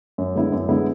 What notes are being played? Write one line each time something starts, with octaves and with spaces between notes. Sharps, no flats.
F#2
D3 G#3 B3 E4
F#2
D3 G#3 B3 E4